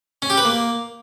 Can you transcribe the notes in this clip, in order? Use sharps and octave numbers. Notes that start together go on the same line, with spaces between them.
C#4
G4
B4
A#3